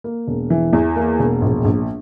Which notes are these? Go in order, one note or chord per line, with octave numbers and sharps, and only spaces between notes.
A#3
E1
E3
E2
A#3
E1
A#1
A#1